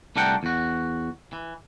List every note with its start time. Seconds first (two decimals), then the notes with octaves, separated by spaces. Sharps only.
0.16 C2 A3 D4 A#4 F#5 G5
0.43 E2 F#4
1.33 E3